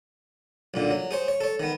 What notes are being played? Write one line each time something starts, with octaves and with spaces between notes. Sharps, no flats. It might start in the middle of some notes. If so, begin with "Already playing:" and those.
B1 A#2 D3
F#3
G#4 C5 C#5
C#5
A4 C#5
D#3 B3